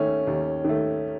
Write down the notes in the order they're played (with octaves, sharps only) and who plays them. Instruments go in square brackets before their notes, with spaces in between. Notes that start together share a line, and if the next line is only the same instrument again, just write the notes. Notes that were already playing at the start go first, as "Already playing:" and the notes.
Already playing: [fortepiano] D#2 D#3 A3 [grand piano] C#4
[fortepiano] D#2
D#3 A3